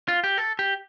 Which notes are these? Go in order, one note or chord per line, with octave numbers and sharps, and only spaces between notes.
F4
G4
A4
G4